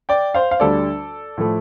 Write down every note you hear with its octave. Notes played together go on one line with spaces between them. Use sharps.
D5 G5
C5 F5
F5
D2 D3 G3 A4 D5
A2 F3 A3